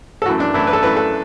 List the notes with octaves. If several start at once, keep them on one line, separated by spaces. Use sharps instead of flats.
A4
F#2 E3 A3 F#4
D4
F#2 E3 A3 E4
B4
A4
F#2 E3 A3 B4
A4